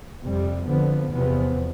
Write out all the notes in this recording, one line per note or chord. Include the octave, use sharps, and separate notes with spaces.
F2 C3 G3
F2 D3 F3 B3
E2 C3 F3 B3